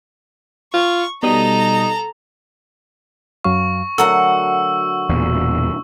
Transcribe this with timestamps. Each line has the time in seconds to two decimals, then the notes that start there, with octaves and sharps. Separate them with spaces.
0.74 F4 C#6
1.23 B2 G3 D#4 A4 A#5 D#6
3.44 F#2 F#3 F5 C#6
3.98 D2 F#3 A4 A#4 C#5 F#5 E6
5.09 E1 E2 A#2